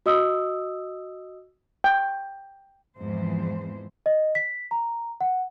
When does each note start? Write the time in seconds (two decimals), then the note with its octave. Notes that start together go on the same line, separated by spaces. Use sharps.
0.06 F#4 D#5 D#6 E6
1.84 G5
2.99 E2 G#2 E3 F3 C4 C5
4.06 D#5
4.35 B6
4.71 A#5
5.21 F#5